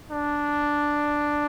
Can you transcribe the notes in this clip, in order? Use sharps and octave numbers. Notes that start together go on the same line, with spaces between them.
D4